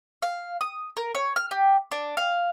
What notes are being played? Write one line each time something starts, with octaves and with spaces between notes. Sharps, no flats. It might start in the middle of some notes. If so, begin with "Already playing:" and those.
F5
D#6
A#4
C#5
F6
G4
D4
F5